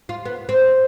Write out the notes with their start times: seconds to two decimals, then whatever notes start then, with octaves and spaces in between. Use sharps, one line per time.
0.09 F4
0.25 B3
0.49 C4